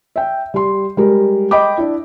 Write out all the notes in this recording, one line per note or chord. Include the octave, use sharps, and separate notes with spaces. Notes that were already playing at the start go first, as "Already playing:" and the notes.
E5 G5
G3 C6
G3 G#3 G4 A#4
D#5 G5 B5 D6
D4 E4